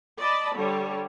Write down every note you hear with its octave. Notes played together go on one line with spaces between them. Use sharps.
D5 D#5 A5 B5
D3 G3 C#5